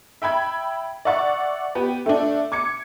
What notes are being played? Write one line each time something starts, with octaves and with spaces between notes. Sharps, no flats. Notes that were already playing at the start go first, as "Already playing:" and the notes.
E5 G5 B5 G#6
D5 E5 F#5 C#6 A6
B3 G4
A3 D4
D6 G#6 C#7